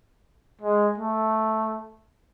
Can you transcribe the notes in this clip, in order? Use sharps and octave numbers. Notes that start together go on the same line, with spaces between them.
G#3
A3